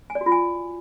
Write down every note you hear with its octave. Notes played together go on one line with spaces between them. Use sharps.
G#5
D5
F#4
F4
G#5